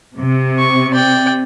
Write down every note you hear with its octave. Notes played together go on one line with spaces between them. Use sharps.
C3
C#6
D5 G5